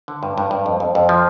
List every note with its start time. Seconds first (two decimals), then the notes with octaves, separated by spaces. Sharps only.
0.08 D3
0.23 G2
0.38 G2
0.51 G2
0.66 F2
0.80 F2
0.95 F2
1.09 F3